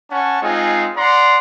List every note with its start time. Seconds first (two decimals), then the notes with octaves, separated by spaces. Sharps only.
0.11 C#4 C#5 F#5 A5 C#6
0.42 G#3 C4 D#4 F4 G#4
0.97 D5 F#5 A#5 C6